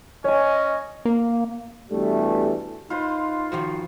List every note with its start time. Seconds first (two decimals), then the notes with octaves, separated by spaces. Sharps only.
0.24 C#4 C#5 D#5 G#5
1.05 A#3
1.91 G2 B2 E3 G3 A3
2.90 D#4 F4 B4 C5
3.52 D#3 F3 F#4